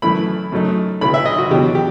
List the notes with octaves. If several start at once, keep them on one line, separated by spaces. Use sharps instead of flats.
F#2 E3 A3 E4 B5
F#2 F#3 A3 D#4
B1 A2 F#3 B5
E5
D#5
F#4
E2 B2 F#3 G4
G4